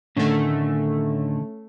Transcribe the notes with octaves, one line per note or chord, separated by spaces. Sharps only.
A2 D3 D#3 A3 C#4